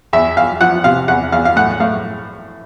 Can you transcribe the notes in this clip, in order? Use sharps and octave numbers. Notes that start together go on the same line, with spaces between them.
E2 E5
E2 F5
F3 F#5
C3 F5
E2 F#5
E2 F5
F5
A2 F#5
A2 F5